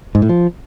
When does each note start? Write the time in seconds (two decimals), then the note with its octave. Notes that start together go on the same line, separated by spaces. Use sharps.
0.15 G#2
0.22 A2
0.29 F3